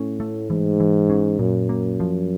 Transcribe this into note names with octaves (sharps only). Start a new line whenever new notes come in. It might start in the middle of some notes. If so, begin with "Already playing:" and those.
Already playing: A2 C#4
A3
G#2 E3
E3
C#4
F#2 A#2
A#3
F3